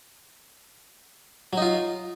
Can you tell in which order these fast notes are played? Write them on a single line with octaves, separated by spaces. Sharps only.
F#3 D#4 F4